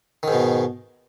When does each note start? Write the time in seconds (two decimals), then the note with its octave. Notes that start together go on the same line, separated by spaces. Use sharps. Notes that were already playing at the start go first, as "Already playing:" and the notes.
0.23 D#3
0.28 G#2
0.32 B2